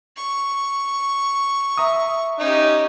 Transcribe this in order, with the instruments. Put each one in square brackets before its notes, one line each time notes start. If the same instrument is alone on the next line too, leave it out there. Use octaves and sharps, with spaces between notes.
[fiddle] C#6
[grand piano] E5 A#5 D#6
[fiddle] C#4 G4 [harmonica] D#4